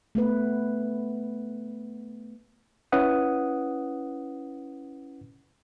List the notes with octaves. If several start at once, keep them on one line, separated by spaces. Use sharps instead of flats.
A3 B3 B4
C#4 E4 B4 F#5 D#6